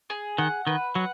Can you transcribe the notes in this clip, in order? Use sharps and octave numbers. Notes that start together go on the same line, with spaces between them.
G#4
D#3 F#5
D#3 B4
F#3 F#5